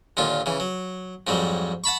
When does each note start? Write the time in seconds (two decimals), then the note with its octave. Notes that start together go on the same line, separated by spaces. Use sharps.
0.17 D#2 A#2 D3 F4
0.46 C#3 E3
0.60 F#3
1.27 F2 G#2 F#3 G3
1.84 F#5 A5 B5 C#6